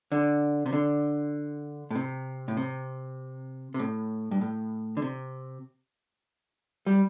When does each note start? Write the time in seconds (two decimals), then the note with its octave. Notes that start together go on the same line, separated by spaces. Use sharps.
0.12 D3
0.66 C3
0.73 D3
1.90 A2
1.95 C3
2.48 A2
2.57 C3
3.74 C3
3.79 A2
4.31 G2
4.41 A2
4.97 D3
5.02 C3
6.86 G3